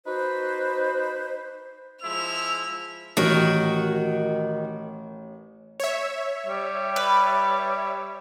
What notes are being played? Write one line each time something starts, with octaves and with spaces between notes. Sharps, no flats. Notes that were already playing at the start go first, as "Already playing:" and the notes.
D#4 F#4 B4 C5
F3 G#3 E4 E6 F7
A1 D#3 F#4
C#5 E5
G3
B4